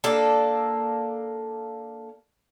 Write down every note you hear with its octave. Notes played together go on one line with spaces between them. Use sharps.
A#3 D4 A4